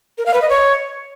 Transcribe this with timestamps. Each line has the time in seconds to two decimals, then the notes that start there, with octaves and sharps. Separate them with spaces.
0.18 A#4
0.26 F5
0.34 B4
0.42 D#5
0.50 C#5